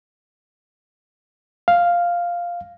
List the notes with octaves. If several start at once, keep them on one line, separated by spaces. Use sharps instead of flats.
F5